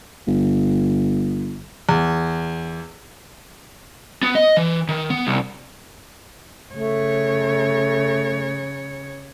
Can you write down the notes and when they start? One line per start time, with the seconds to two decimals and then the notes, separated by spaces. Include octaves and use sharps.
0.27 G1
1.89 E2
4.23 B3
4.35 D#5
4.57 E3
4.89 D#3
5.10 B3
5.27 C2
6.74 C#3 A3 C#5